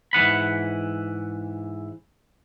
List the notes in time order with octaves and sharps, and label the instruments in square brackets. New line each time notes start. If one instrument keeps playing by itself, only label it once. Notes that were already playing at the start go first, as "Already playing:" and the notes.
[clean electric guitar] G#2 E3 F#5 B5